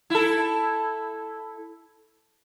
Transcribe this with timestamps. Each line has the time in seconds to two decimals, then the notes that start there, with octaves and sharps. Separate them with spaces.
0.10 E4 A4